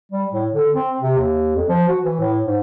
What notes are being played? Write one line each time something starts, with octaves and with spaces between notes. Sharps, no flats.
G3
A2
D3
C4
C3
D#2
F2
F3
F#4
E3
A2
G#2